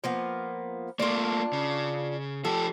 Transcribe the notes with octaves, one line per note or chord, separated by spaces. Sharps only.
F3 A#3 B3
A3 A#3 D4 F4
C#3
F3 G4 A4